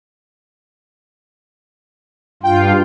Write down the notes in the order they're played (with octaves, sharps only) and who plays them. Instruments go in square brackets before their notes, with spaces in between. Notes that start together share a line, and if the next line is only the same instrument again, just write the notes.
[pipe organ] G2 F4 [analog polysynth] G5